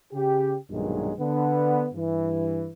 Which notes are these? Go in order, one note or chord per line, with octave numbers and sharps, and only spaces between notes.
C#3 G4
B1 G2 A#2 D#3 F#3 G#3
D3 B3
G2 E3